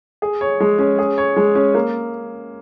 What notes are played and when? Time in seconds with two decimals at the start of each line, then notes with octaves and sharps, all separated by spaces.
0.22 G#4
0.41 C#5
0.60 G#3
0.78 C#4
0.99 G#4
1.18 C#5
1.36 G#3
1.55 C#4
1.74 A#3